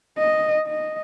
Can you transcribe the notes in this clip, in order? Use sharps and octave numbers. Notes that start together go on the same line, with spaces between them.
D#5
D#5